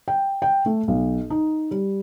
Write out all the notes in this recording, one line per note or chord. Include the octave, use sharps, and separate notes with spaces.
G5
G5
A3
B1
D#4
G3